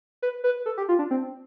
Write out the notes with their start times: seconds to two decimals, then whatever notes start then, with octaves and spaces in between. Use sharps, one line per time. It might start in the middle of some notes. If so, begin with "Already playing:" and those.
0.22 B4
0.44 B4
0.66 A4
0.77 G4
0.89 F4
0.99 D4
1.11 C4